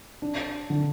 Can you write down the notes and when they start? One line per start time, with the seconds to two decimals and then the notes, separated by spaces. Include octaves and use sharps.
0.22 D4
0.70 D3